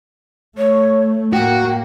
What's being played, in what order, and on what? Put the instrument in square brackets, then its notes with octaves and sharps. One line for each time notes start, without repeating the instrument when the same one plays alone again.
[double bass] A3 [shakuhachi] C#5
[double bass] A2 A#3 [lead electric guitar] F#4 [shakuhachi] G5